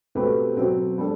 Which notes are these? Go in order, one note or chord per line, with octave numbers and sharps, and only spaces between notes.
B2 A3 C4 G4 B4
B2 F#3 C4
G3 D4 A4